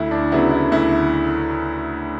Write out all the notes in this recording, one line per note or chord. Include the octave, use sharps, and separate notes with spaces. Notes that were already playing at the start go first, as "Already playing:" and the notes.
Already playing: D2 E4
D4
C#3 F#3 B3 E4
E4
D2 E4